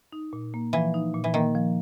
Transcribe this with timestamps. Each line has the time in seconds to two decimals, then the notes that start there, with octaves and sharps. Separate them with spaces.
0.12 D#4
0.33 A#2
0.54 A#3
0.73 E3 F3
0.94 D#4
1.14 A#2
1.24 E3
1.34 D#3 A#3
1.55 F3